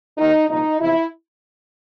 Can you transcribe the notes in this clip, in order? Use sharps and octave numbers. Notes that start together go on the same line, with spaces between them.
D#2 D#3 D#4
C2 A#2 F3 D#4
E2 C3 F3 E4